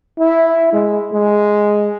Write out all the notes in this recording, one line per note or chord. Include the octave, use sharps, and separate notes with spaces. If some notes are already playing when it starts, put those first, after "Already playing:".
E4
G#3
G#3